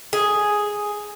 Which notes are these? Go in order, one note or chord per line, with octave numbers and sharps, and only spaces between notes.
G#4